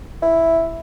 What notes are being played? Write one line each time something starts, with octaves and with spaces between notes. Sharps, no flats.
E4